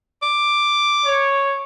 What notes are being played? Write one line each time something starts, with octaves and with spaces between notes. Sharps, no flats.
D6
C#5